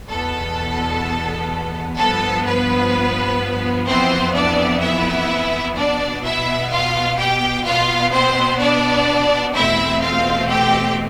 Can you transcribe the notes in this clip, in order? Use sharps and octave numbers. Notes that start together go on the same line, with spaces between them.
E2 B2 B3 A4
G2 F3 B3 A4
B4
F2 E3 B3 C4 C5
D4 D5
E4 E5
B2 B3 D4 D5
E4 E5
F4 F5
G4 G5
B2 B3 F4 F5
C4 C5
D4 D5
E2 B2 A3 C4 E4 E5
F4 F5
G4 G5